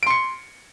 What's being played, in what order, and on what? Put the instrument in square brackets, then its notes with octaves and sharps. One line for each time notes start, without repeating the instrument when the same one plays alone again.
[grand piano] D7
C6
C#7